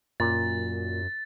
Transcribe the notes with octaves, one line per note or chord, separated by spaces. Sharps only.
F#2 A#2 A6